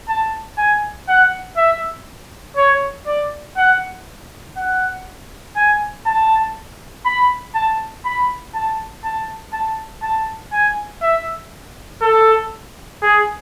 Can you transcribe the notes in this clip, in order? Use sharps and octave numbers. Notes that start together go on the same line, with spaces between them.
A5
G#5
F#5
E5
C#5
D5
F#5
F#5
G#5
A5
B5
A5
B5
A5
A5
A5
A5
G#5
E5
A4
G#4